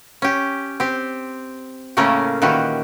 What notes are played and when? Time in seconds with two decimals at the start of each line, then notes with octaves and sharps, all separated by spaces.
0.22 C#4 G4
0.80 C4 G4
1.97 A2 C#3 A3 A#3 C#4 A#4
2.42 A#2 D#3 E3 F#4 G4